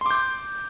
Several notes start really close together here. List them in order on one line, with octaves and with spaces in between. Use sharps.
C6 D6 G6